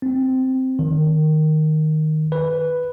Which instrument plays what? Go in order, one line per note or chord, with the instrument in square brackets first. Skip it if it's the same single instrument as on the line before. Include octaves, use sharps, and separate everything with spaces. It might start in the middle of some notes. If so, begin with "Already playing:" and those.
[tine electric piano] C4
D#3
B4